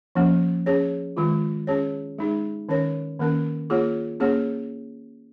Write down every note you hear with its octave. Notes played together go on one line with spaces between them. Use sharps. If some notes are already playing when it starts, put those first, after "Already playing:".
F3 A#3 C#4
C#4 G#4 C#5
D#3 G#3 F4
C#4 G#4 C#5
G#3 D#4 G#4
D#3 C#4 A#4 C#5
D#3 A#3 C#4 A#4
A#3 F4 G#4 C#5
A#3 C#4 G#4 C#5